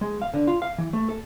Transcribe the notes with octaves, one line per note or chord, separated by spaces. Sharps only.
G#3
F5
D3
F4
F5
E3
A3
A4